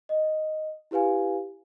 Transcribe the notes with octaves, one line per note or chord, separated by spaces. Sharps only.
D#5
E4 G4 B4 F5 G#5